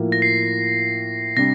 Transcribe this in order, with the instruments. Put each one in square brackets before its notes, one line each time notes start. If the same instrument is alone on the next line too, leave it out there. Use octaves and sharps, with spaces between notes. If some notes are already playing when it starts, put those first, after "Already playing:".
Already playing: [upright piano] A2 F3 A#3
[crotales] A#6
C7
[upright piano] C3 G3 D4 [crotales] A#6